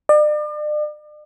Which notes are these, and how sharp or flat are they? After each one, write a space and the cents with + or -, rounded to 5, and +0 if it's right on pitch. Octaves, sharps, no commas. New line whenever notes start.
D5 +40